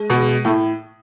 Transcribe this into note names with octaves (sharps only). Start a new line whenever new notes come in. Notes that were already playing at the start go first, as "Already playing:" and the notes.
Already playing: G#3
B2
A2 A3